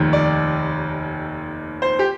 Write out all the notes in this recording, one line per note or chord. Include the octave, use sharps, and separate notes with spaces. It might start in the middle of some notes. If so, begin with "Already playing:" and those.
Already playing: F1 D#2 D#3
D5
C5
G4